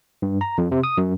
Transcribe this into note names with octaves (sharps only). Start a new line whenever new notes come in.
G2
A#5
F2
C3
D#6
F#2